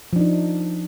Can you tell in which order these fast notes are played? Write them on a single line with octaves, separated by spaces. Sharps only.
F3 D4 D#4